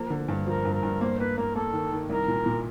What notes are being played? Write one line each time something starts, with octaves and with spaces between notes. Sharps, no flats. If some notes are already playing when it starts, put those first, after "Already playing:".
Already playing: F3 A#3 A#4
D3
G2
F3 A#4
G2
A#4
G2
A#3 C5
A#3 B4
A#3 A#4
A#3 A4
D#3
D#3
C2 A#4
A#2
A#2